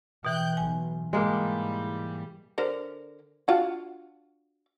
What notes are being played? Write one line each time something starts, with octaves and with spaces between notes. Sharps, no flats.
B2 E3 G5 F#6 G6
B1 G#5
G#2 E3 G3 G#3 A#3
D3 A#4 C5
D4 F4 F#4